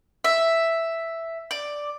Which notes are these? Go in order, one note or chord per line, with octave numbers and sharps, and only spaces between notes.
E5
D5